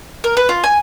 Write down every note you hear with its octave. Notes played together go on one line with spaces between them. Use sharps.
A#4
B4
F4
G#5